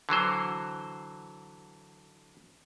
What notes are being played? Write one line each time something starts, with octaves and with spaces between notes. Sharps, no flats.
D3 E3 F#3 C5